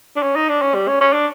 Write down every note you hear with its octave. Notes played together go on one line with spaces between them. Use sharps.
D4
C#4
D#4
D4
C#4
G3
C#4
C#4
D4